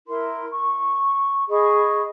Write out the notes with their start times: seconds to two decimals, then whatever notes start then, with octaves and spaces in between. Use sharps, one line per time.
0.07 E4 A#4 C6
0.50 C#6
1.48 G#4 D#5 B5 C#6